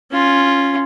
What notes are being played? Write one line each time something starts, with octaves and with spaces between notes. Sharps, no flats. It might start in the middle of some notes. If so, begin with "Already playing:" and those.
C#4 F4